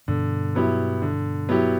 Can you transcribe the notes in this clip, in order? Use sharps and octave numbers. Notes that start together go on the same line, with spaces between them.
G2 B2 D3
F#3 B3 E4 G4
D3
F#3 B3 E4 G4